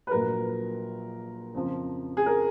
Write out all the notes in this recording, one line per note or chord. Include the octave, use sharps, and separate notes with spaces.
B4
A#1 A#2 F#3 A#4
F2 C#3 F3
G#4
A#4